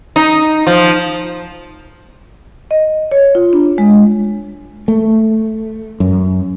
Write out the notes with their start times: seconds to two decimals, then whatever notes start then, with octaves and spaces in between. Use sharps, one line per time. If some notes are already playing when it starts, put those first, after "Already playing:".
0.16 D#4
0.67 F3
2.71 D#5
3.11 C#5
3.35 F4
3.53 D4
3.78 G#3
4.88 A3
6.00 F#2